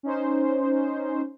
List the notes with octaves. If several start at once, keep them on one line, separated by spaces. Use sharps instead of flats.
C#4 D#4 C5